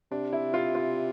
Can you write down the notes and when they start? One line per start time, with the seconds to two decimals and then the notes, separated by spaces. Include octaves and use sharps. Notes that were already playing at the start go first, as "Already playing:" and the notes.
0.11 C3 D4
0.33 E4
0.54 F4
0.75 F4